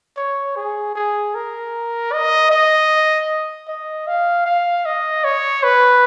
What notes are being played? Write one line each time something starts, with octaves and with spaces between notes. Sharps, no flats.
C#5
G#4
G#4
A#4
D#5
D#5
D#5
F5
F5
D#5
C#5
B4